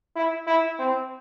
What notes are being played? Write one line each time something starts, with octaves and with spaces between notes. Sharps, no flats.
E4
E4
C4